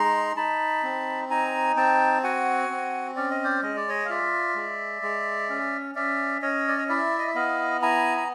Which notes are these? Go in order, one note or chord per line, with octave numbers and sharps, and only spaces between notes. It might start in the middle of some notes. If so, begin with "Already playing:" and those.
Already playing: G#3 D#4 A#5 C6
D#4 A5 B5
C4
D#4 G#5 A#5
C4 G5 A5
F#4 F#5 G#5
C4
C#4 D5
D#5
C5 D5
G#3 D#5
D5
C#5 D#5
F5
F4 D5 E5
G#3
G#3
C#4
C#4 D5 E5
C#4 C#5 D#5
D5
D#5
E4 D5 E5
D#5
E5
B3 D#5 F5
E4 G#5 A#5
A#5